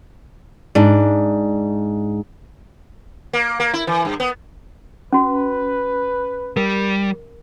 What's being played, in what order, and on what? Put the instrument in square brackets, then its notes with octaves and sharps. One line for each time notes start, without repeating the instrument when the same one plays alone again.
[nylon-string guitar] G#2 D4
[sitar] A#3
A#3
E4
E3
G2
B3
[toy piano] C#4 F#4 [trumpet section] B4
[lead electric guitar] G3 [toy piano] A#4